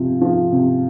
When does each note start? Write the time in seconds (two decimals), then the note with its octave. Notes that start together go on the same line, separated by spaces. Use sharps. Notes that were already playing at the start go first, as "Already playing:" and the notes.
Already playing: C3 F3
0.21 F3
0.52 C3